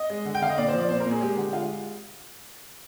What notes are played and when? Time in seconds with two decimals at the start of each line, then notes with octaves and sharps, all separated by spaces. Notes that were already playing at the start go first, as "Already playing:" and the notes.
Already playing: D#5
0.10 G#3
0.25 D3
0.35 G5
0.41 D3 F5
0.49 D#5
0.57 A#2 D5
0.68 C5
0.73 F3 D5
0.89 A#2 C5
1.00 A#4
1.05 A#2
1.11 G#4
1.21 G#3 G4
1.37 D3
1.53 G#3 F4